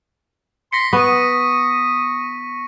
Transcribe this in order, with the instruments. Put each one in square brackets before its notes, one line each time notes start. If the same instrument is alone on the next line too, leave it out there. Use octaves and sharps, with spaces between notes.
[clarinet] C6 [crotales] A#6 B6 C#7
[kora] B3 [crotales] C#6 D#7 [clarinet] D#6